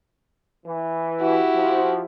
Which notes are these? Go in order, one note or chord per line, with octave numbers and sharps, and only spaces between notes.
E3
E4 F#4 G4
F3